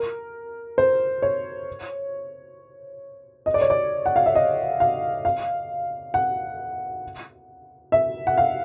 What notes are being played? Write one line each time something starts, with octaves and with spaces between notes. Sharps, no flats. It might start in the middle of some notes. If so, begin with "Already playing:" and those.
Already playing: A#4
C5
C#5
D#5
D5
C#5
D5
F#5
F5
E5
D#5
F5
F5
F#5
E5
F#5
F5